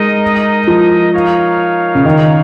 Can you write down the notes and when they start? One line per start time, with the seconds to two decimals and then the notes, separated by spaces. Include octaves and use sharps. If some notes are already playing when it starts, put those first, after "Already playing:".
Already playing: G#3 D#4 A#4 D#5
0.68 F3
1.13 D#4 A#4 C#5 F5
1.95 C#3
2.05 D#3